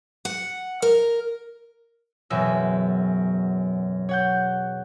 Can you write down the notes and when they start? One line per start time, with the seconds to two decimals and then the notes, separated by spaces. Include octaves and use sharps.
0.25 F#5
0.82 A#4
2.30 E1 F#2 B2 E5
4.09 C#5 F#5 G6